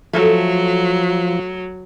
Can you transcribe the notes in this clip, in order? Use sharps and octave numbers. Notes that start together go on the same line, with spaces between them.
F3 F#3 A3 A4